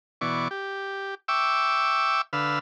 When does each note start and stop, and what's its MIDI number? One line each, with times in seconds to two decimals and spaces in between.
0.21 0.48 47
0.21 0.48 52
0.21 0.48 74
0.21 0.48 85
0.51 1.15 67
1.28 2.21 76
1.28 2.21 79
1.28 2.21 85
1.28 2.21 86
1.28 2.21 88
2.33 2.59 50
2.33 2.59 71
2.33 2.59 77
2.33 2.59 88